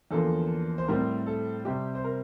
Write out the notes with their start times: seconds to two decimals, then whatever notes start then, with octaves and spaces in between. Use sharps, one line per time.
0.11 E2 D3 F3 A#3 A4
0.78 C5
0.88 A2 G3 C4 A#4
1.27 A4
1.65 C3 G3 C4 G4
1.95 C5
2.04 A#4